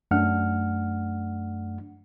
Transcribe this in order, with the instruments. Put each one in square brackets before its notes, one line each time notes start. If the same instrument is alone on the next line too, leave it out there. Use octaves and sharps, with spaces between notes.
[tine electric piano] F#2 A3 D4 F#5 F6